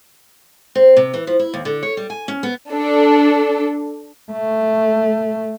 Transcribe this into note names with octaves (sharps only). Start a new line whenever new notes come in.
C4
C3
E3
F3
E4
D#2
D3
C#5
G3
G#5
C#4
B3
D4 A4
A3